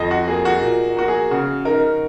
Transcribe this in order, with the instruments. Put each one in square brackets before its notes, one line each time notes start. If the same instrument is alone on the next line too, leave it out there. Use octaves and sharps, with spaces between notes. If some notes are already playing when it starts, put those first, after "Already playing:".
Already playing: [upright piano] F2 [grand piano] D#5
[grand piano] F#4
[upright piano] A#3 [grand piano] G#4
[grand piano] F#4
[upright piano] A#2
[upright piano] A#3 [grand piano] F#4
[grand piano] G#4
[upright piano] C#3 [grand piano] F#4
[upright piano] D#4 [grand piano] A#4